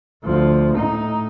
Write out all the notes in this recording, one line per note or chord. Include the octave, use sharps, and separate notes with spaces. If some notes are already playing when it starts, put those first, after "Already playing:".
D2 F3
A2 D#4